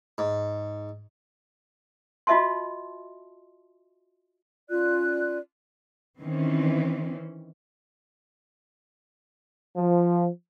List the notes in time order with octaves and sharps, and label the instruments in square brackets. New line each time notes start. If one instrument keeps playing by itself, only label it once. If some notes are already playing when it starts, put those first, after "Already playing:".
[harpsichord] G#2
[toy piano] F4 F#4 D#5 E5 A5 C6
[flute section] C#4 F4 D5 F#6
[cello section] D#3 E3 C4 C#4
[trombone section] F3